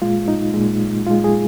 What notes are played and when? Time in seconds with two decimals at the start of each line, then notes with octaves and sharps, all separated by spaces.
0.02 A#2 G#3 F4
0.28 D#4
0.54 A#2 G#3
1.06 A#2 G#3 F4
1.24 G#4